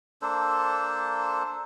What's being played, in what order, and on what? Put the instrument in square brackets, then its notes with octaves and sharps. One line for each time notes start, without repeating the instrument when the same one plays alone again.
[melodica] A#3 D4 A4 C5